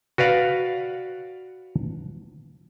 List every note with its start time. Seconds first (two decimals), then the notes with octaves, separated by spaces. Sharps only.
0.18 F#4 B4 D5 F5 F#5